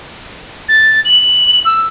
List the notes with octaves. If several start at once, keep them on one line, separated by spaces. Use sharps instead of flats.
A6
F#7
E6